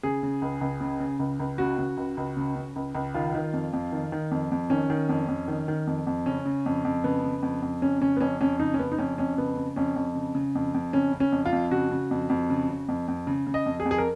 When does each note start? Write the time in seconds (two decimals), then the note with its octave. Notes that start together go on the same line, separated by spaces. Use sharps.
0.03 C#3 G#4
0.23 C#3
0.42 C#2
0.61 C#2
0.81 C#3
1.00 C#3
1.19 C#2
1.40 C#2
1.58 C#3 F#4
1.78 C#3
1.97 C#2
2.17 C#2
2.37 C#3
2.56 C#3
2.76 C#2
2.95 C#2
3.14 D#3 F4
3.34 D#3
3.53 F2
3.73 F2
3.92 D#3
4.12 D#3
4.31 F2
4.51 F2
4.70 D#3 C#4
4.90 D#3
5.09 F2
5.28 F2
5.48 D#3
5.68 D#3
5.87 F2
6.07 F2
6.26 C#3 C#4
6.46 C#3
6.66 F2
6.85 F2
7.04 C#3 B3
7.24 C#3
7.43 F2
7.62 F2
7.82 C#3 C#4
8.01 C#3 C#4
8.17 B3
8.21 F2 C#4
8.41 F2 C#4
8.60 C#3 D#4
8.74 C#4
8.79 C#3 B3
8.92 D#4
8.98 F2 C#4
9.18 F2 C#4
9.38 C#3 B3
9.57 C#3
9.76 F2 C#4
9.96 F2
10.15 C#3
10.35 C#3
10.55 F2
10.74 F2
10.93 C#3 C#4
11.13 C#3
11.20 C#4
11.32 F2
11.46 F4
11.52 F2
11.71 C#3 F#4
11.91 C#3
12.11 F2
12.30 F2
12.50 C#3
12.69 C#3
12.88 F2
13.08 F2
13.27 C#3
13.47 C#3
13.54 D#5
13.66 F2
13.80 G#4
13.85 F2
13.91 G#4
13.98 A#4